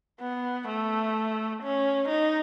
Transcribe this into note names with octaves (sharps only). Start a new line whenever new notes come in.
B3
A3
C#4
D#4